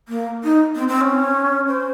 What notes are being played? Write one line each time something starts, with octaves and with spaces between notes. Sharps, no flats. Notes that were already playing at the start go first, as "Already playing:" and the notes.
A#3
D#4
C4
C4
C#4
C5